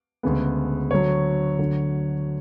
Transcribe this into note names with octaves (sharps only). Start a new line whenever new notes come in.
D2 C#3 G#3 B3
D2 D3 F#3 C#5
D2 D3 F#3